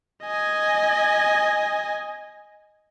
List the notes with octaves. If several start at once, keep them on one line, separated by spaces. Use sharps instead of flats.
D#5 G#5